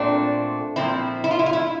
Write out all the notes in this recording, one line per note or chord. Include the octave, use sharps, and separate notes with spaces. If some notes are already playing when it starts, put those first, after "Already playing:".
Already playing: A#2 A3 C4 D4
A#2 F3 C4 E4
E4
F4
E4
F4
E4